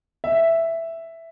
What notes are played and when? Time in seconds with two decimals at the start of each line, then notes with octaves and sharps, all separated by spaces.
0.24 E5